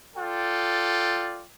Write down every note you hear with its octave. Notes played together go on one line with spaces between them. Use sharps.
F4 A4 D5 G5